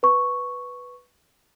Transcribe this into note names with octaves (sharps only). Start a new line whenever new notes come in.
B4 C#6